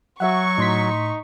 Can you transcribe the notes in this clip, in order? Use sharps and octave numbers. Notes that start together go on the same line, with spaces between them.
F#3 F#4 E5 F#5 C#6
A2 D#4 C6 B6